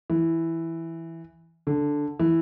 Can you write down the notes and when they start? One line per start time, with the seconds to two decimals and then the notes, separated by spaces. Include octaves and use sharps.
0.10 E3
1.67 D3
2.20 E3